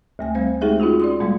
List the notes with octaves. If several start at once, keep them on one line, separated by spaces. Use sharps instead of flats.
D2 A3 G#5
G3 C4 C5
G#3 A3 D#4 G4 G#4 E5
C#4 D#4 F4 F#4 G#4
D5 C6 D#6
A#2 G3 G#3 A#3